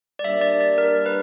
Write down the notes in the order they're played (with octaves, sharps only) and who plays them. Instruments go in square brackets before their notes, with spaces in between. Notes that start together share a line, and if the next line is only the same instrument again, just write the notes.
[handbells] D5
[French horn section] G3 A#3 D4 [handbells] E5
[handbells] D5
D5
A#4
B4